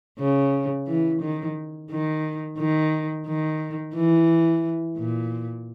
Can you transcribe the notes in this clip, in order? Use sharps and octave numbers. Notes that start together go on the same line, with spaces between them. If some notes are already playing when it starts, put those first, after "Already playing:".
C#3
E3
D#3
D#3
D#3
D#3
E3
A#2